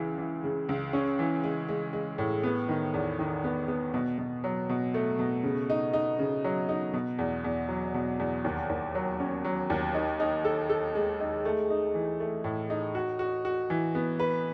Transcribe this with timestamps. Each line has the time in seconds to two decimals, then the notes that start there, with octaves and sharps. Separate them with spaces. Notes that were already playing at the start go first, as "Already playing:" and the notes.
Already playing: C#2 E3
0.18 E3
0.44 C#3
0.69 C#2
0.93 C#4
1.19 E3
1.44 G#3
1.68 G#3
1.93 G#3
2.18 A2
2.43 B3
2.69 D#3
2.94 E2
3.19 D#3
3.44 B3
3.68 B3
3.94 B2
4.18 B2
4.44 F#3
4.69 B2
4.94 A3
5.19 B2
5.43 C#3
5.70 D#4
5.93 D#4
6.19 C#3
6.44 F#3
6.69 D#4
6.93 B2
7.19 E2
7.44 E2
7.69 F#3
7.94 B2
8.20 E2
8.44 D#2
8.69 D#2
8.95 F#3
9.20 C#4
9.45 F#3
9.70 D#2
9.94 D#4
10.20 D#4
10.45 A4
10.69 A4
10.95 G#3
11.20 D#4
11.45 A3
11.70 D#4
11.95 E3
12.20 A3
12.44 A2
12.70 D#4
12.95 F#4
13.19 F#4
13.45 F#4
13.70 E3
13.95 B3
14.20 B4